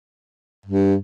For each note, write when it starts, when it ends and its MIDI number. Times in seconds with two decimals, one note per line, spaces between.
0.66 0.96 43